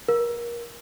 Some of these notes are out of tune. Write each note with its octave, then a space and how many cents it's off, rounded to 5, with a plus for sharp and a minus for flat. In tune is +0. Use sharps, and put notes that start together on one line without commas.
A#4 +25